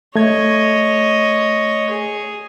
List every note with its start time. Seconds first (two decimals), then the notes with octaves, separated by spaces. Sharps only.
0.16 A3 C#5 D#5 G#6
1.89 G#4